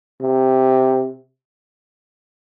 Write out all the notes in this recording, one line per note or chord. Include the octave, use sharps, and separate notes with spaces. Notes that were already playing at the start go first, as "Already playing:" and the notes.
C3